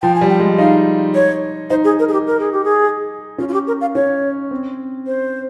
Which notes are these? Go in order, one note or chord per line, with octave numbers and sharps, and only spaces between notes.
F3 G5
G#5
G3
G5
G#3
D#4 F5
C#5
D#4 C5
G#4
A#4
G#4
G4
A#4
G#4
G4
G#4
C#4 F4
F4
G4
A#4
F5
C#4 C#5
C4
C5